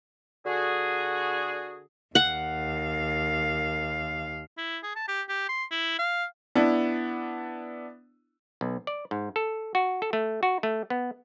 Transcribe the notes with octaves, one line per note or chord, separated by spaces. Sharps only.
D3 F#4 G#4
D#2 F5 F#5
E4
G#4
A5
G4
G4
C6
E4
F5
B3 D4 E4
B1
D5
G#2
A4
F#4
A4
A3
F#4
A3
B3